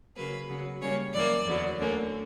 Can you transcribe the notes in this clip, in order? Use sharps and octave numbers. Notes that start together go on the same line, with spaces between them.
C#3 F#3 A#3 B4
C#3 F#3 B3
C#3 G3 A#3 C#4 C#5
F#2 E3 A#3 D5
E2 D3 F#3 B3
D2 D3 A#3 C#4